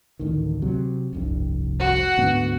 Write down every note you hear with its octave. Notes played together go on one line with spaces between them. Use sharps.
A1 D2 D#3
C3 F#3
F1 C2 G2
F#4 F#5
D2 G#2 B3